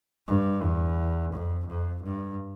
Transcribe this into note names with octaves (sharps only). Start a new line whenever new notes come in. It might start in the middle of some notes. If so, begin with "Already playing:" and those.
G2
E2
F2
F2
G2